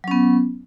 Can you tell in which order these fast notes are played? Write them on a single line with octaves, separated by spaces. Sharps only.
F#3 C#4 B3